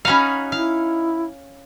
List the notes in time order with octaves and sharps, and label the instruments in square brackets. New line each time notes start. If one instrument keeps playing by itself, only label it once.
[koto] C#4 F#4 F5 [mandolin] D#4 B5
[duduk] E4 [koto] F5